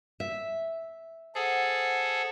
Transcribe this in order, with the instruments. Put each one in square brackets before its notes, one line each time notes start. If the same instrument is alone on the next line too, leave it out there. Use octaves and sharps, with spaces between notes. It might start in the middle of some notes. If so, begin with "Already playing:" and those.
[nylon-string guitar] E5
[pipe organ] G#4 A4 [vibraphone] C5 F#5